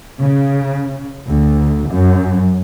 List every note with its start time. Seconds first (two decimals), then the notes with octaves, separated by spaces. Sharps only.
0.19 C#3
1.27 D2
1.90 F#2